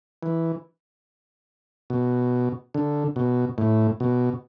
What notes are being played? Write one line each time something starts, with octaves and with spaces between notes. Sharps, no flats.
E3
B2
D3
B2
A2
B2